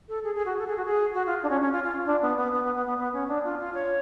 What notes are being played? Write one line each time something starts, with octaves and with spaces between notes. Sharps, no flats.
A4
G#4
G#4
F#4
A4
G#4
F#4
G#4
F#4
F4
D4
C#4
C#4
F4
F4
D4
B3
B3
B3
B3
B3
B3
B3
C#4
D4
F4
F4
C#5